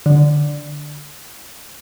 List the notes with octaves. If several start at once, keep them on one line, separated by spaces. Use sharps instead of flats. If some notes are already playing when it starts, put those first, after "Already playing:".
D3